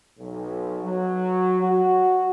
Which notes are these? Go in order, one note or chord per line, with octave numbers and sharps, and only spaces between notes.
B1
F#3
F#4